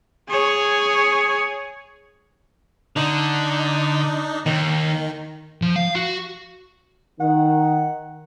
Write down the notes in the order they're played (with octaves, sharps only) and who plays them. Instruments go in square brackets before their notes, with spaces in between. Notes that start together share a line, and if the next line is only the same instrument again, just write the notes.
[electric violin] G#4 C#5
[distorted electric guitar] D3 [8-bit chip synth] D4 D#4
[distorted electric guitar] D#2 [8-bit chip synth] D#3
[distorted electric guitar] F3
F5
F#4
[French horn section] D#3 [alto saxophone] F#5